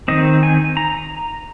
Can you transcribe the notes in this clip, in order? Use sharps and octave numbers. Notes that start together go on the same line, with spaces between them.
D#3 C4 D#5
G#5
A#5